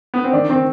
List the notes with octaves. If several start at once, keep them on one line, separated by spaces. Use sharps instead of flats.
B3
C4
D#3 D4
D#3 C4